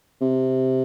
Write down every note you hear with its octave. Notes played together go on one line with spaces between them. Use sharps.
C3